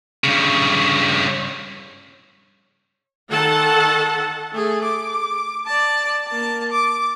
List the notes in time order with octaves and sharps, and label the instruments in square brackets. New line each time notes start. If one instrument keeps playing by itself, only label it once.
[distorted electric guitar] G2 C#3
[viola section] D#3 A4 F#5 A5
[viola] A3 G#4
D6
D5 A5
A#3 A5
D6